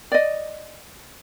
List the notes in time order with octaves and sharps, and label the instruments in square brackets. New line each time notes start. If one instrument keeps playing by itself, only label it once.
[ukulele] D5 D#5